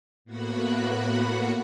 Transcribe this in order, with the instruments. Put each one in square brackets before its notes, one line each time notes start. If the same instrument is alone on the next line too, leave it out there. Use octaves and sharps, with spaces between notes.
[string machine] A2 A#3 B3 F#4 F#5 B5